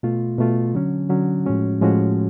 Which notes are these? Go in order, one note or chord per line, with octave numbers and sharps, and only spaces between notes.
B2 A3 F4
B2 A3 F4
D3 F#3 C#4
D3 F#3 C#4
A2 F3 G#3 C#4 F#4
A2 F3 G#3 C#4 F#4